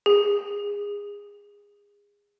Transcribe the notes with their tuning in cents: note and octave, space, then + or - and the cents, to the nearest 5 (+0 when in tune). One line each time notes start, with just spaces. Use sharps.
G#4 -25